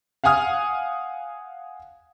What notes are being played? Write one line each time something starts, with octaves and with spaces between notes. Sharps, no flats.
F5 F#5 G#5 D#6 F6